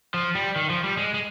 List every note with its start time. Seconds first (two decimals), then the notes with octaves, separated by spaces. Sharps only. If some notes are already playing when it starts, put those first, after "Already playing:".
0.14 F3
0.35 G3
0.56 D#3
0.70 F3
0.84 G3
0.97 G#3
1.14 G#3